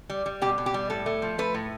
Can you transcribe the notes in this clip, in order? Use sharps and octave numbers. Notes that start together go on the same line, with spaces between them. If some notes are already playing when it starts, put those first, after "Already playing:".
G3
G3
B2 G4
B2
G4
G3
A2 A4
A3
F3
A3 B4
A2